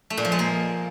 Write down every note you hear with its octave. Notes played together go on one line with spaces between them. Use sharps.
A3
A#2
F3
G#3
A#3